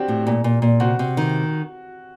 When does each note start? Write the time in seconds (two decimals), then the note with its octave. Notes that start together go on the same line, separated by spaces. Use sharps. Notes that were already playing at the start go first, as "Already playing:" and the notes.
Already playing: C4 D4 F#4 G4
0.08 A2
0.27 A#2
0.44 A#2
0.62 A#2
0.80 C3 F#4
0.99 C3
1.17 D#3